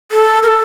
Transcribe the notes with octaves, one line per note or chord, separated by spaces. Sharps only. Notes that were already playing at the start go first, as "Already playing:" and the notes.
A4
A#4
A4